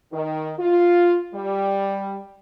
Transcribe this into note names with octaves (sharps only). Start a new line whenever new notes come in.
D#3
F4
G3